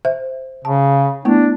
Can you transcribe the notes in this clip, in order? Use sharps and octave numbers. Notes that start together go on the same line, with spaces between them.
C5 E5
C#3 A5
A3 B3 D4 E4